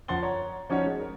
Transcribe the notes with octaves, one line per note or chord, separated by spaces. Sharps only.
F#2 F3 F#5 C6 A6 G7
C#5 A#5
F3 C#4 D#4 F4 F#4 C#5
G#3
A#4